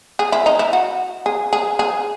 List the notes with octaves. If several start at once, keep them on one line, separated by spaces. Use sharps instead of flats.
G#4
E4
D#4
E4
F#4
G#4
G#4
G#4